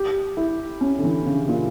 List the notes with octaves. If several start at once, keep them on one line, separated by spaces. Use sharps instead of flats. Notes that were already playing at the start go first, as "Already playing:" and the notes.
Already playing: G4
E4
C#4
D3
E3
C#3
A#2